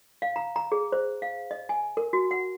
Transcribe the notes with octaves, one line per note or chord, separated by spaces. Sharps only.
F5
A#5
A#5
G#4
C5
F5
D#5
G#5
A#4
F#4
F#5